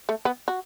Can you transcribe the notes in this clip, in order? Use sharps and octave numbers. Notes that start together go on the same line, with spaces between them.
A3
B3
F#4